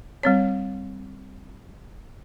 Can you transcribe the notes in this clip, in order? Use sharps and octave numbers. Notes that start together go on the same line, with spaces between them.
G3 C4 C#5